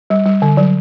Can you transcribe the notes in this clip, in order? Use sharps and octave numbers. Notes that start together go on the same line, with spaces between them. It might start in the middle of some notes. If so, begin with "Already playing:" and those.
G3
G3
D3
F#3